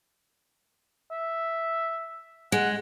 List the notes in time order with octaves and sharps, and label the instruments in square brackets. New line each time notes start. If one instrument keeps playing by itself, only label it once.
[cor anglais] E5
[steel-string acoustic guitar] G#3 [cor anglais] F#5